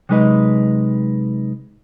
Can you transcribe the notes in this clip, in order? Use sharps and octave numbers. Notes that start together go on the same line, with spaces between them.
C3 F#3 G#3 D#4 B4 D#5